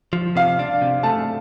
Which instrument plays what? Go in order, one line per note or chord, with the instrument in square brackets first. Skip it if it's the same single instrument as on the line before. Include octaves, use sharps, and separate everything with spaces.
[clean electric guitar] F3
[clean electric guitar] C3 [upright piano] F5
[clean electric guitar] D4
C3
[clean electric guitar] A3 [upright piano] A5